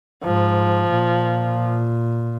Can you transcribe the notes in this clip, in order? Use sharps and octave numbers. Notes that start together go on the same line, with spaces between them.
G#2 F3
A#2